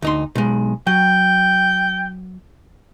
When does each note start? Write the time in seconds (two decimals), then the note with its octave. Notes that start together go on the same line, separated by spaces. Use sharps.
0.02 D2 D#4 C6
0.35 B1 G#3
0.87 F#3 G5